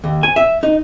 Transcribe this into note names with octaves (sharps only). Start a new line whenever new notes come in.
D#2
G#5
E5
D#4